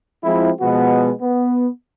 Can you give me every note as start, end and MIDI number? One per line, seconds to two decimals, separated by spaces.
0.24 0.51 53
0.24 0.51 56
0.24 0.51 60
0.24 0.51 64
0.61 1.11 47
0.61 1.11 53
0.61 1.11 56
0.61 1.11 59
0.61 1.11 66
1.21 1.68 59